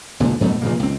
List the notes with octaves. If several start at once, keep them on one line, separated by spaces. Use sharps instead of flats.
C#2 A#2 D3
G2 B2 G3 A3
F1 A#2 C#3 A#3
C#2 C4